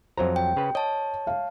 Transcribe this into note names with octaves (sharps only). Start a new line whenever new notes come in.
F2 F#3 C5 A#5
G5
C#3 B4
C#5 D#5 A5
F5